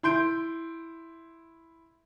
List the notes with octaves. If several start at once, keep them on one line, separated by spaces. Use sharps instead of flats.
E4 C6 G6 D7